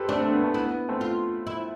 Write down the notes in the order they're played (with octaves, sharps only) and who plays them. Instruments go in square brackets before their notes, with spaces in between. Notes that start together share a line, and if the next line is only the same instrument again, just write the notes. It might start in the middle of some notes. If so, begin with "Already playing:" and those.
Already playing: [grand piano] G4 A4 B4 C5
[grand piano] A3 C4 [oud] D4
[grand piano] A3 C4
B3
A3
[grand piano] B3 [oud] E4
[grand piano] B3
A3 C4
[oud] F4
E4